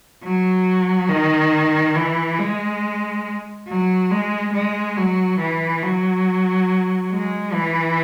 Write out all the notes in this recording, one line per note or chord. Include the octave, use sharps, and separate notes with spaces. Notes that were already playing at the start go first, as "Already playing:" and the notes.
F#3
D#3
E3
G#3
F#3
G#3
G#3
F#3
E3
F#3
G#3
E3